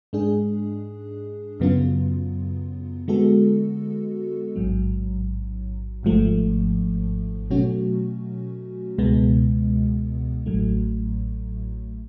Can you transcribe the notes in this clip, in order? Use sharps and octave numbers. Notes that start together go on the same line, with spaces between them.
G#2 G#3 D4 G#4
F#2 C#3 F#3 B3 F4
D3 G#3 B3 F#4 A4
A1 G#2 F#3
G#1 G#2 F3 A3
B2 F#3 A3 C#4 F#4
C#2 B2 G#3 B3
A1 A2 F#3 A3